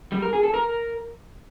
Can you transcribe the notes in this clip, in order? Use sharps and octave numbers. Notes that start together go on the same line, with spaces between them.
G3
A#4
G#4
A4
A#4